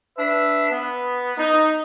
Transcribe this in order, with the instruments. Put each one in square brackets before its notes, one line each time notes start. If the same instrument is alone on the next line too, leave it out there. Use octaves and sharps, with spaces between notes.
[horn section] D4 B4 E5
B3
D#4